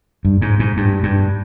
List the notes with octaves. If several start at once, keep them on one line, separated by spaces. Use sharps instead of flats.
G2
G#2
G#2
G2
G2